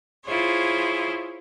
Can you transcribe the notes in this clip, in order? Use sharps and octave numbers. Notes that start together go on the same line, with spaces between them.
E4 F4 G#4 C5 C#5